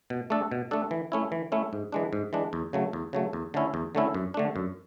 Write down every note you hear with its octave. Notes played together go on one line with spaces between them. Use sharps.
B2
A3 D4 A4
B2
A3 D4 A4
E3
A3 C#4 E4
E3
A3 C#4 E4
G#2
E3 G#3 D4
G#2
E3 G#3 D4
E2
C#3 F#3 A3
E2
C#3 F#3 A3
E2
D3 A3 C#4 E4
E2
D3 A3 C#4 E4
F#2
D3 A3 D4
F#2